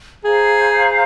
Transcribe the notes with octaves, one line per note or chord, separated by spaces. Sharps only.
G#4 C5 F5 A#5